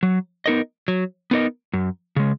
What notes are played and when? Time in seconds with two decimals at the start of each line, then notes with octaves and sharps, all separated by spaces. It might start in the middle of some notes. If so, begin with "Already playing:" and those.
0.03 F#3
0.46 B3 D#4 A#4 D#5
0.88 F#3
1.31 B3 D#4 A#4 D#5
1.73 F#2
2.16 C#3 G#3